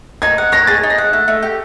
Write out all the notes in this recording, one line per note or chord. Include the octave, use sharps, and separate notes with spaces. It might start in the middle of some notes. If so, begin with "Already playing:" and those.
D#4 G#6
F#5
C#5 A#6
G#4 A6
D#4
A#6
F#5
A3
A3
G4